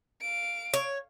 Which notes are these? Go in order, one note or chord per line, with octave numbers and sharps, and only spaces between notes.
F5 D7
C#5